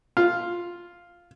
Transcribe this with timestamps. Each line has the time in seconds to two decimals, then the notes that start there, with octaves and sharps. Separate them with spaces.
0.17 F4